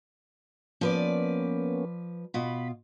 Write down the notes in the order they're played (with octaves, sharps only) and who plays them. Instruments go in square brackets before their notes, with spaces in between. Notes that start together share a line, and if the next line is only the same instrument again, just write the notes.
[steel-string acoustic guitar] F3 B4 D5 [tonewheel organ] A#3 B3 C#4
[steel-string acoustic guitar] B2 F4 [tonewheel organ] B5